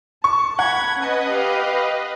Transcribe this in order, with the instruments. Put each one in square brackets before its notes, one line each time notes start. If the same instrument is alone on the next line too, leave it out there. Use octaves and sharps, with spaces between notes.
[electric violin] A5 [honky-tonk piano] C#6
[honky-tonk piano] F#5 [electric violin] B5 G#6
[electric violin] C#4 A5 [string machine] B4 D#5
[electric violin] G4 F5